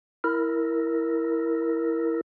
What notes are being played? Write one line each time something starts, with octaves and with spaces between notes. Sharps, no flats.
E4 A#4